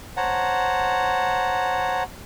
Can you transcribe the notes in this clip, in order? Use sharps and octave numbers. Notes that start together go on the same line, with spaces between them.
C5 C#5 F#5 A5 A#5